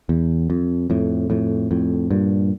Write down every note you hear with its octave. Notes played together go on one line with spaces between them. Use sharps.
E2
F2
F2 A2
F2 A2
F2 A2
G2 A#2